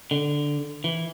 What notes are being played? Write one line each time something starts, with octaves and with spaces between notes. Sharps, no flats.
D3
E3